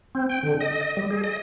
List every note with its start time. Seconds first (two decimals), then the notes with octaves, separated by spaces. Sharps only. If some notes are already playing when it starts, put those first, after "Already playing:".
0.15 C4
0.29 G5
0.43 D3
0.60 D#5
0.81 D#5
0.97 G3
1.11 G#4
1.24 D#5